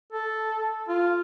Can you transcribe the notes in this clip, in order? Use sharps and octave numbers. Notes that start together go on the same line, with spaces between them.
A4
F4